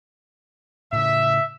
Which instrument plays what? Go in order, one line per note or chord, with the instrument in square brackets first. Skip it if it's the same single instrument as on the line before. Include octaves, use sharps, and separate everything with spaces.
[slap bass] A2 C#3 [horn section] E5